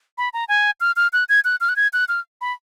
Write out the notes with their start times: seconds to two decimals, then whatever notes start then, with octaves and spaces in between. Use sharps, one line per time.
0.18 B5
0.33 A#5
0.49 G#5
0.81 F6
0.96 F6
1.13 F#6
1.29 G#6
1.45 F#6
1.61 F6
1.69 F#6
1.76 G#6
1.93 F#6
2.09 F6
2.41 B5